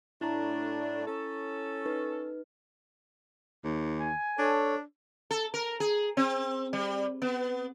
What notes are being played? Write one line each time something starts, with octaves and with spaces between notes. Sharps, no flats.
A2 A3 D4 E4 A#5
C#4 A4
D#4 B4
D#2
G#5
D4 A4 C#5
A4
A#4
G#4
C4
G3
B3